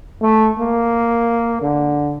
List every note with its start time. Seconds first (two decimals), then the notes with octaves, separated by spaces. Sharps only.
0.22 A3
0.59 A#3
1.61 D3